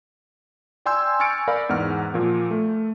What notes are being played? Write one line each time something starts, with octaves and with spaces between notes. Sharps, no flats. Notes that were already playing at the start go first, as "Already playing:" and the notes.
D5 G5 G#5 C6 E6 G6
G#5 C#6 F6 A6 C#7 D7
A#4 D5 F5 B5
E2 G#2 F#5 F6
A#2 F3 A#3
A3